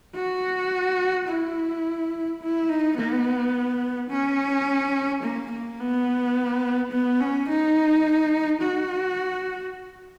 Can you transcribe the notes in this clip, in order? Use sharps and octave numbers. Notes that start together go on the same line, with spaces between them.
F#4
E4
E4
D#4
B3
C#4
A#3
A#3
B3
B3
C#4
D#4
F#4